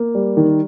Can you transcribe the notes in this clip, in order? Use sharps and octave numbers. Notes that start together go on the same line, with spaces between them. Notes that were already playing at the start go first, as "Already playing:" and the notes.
Already playing: A#3
G3
D#3